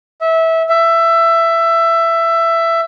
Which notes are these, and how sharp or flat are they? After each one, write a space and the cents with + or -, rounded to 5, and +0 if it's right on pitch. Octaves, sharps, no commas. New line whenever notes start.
E5 -20
E5 +15